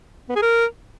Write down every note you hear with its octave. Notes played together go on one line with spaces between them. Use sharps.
B3
G#4
A#4